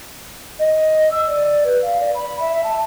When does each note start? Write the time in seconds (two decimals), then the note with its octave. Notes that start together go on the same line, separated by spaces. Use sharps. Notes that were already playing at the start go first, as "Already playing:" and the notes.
0.59 D#5
1.11 E6
1.27 D5
1.64 B4
1.82 F5
1.97 D5
2.14 B5
2.40 E5
2.64 A5